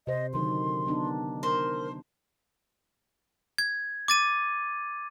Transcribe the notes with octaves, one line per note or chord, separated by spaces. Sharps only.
C3 C5 D#5
D3 D#3 F#3 C6
B3 D4 D#4
A#4 C5
G#6
D6 A6 D#7